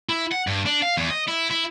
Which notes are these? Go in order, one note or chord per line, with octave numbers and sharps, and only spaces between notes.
E4
F#5
G2
D4
F5
E2
D#5
E4
E4